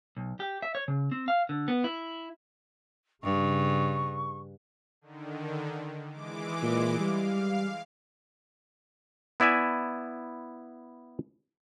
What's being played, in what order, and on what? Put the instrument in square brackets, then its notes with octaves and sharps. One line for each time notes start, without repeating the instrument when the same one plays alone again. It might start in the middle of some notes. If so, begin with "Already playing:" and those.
[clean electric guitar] B1
G4
E5
C#5
C#3
C4
F5
D3
B3
E4
[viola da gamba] G2 [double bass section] C#3 [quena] C#6
[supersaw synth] D3 D#3
E3 G#3 D6
[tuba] A#2
[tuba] G3 [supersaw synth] F5
[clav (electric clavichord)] B3 E4 D5 E5 G#5